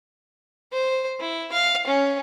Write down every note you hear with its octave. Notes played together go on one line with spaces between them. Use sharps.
C5
E4
F5
C#4